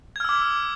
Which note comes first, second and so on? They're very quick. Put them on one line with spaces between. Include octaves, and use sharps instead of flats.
G#6 F6 E6 D6